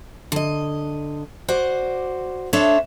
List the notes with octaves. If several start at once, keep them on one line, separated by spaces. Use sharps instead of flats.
D3 D#5
F#4 C5 D5
D4 A4 C5 C#5 E5